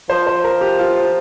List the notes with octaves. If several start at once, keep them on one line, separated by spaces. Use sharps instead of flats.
F3 C5
C5
A#4
G4
F4